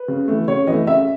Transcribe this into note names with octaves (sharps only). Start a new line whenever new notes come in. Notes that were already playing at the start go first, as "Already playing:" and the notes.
Already playing: B4
C#3
E3 A3
C#3 C#5
E3 A3 D#5
C#3 E5